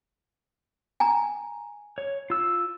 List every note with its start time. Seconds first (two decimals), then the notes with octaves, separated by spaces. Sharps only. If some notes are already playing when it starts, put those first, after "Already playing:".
1.00 G#5 A#5
1.98 C#5
2.30 F4 E6